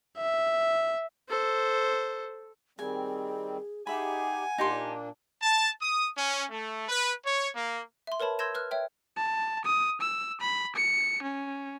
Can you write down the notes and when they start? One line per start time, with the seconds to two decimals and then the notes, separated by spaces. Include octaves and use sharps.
0.18 E5
1.29 A4 C5
2.79 D#3 G3 C4 G#4 G#5
3.87 D#4 G4 G#4 E5 F#5 G#5 B5
4.58 A#2 A#3 D4 D#4 G4 C6
5.42 A5
5.80 D#6
6.16 C#4
6.48 A3
6.88 B4
7.24 C#5
7.54 A#3
8.07 E5 C6
8.20 A#4 B4 C#5 A5 B5
8.39 C6 E6 G6 G#6 A#6 E7
8.55 B4 F6 F#6
8.71 C#5 E5 G5
9.16 A5
9.65 D#6
10.01 E6
10.41 B5
10.76 C#7
11.23 C#4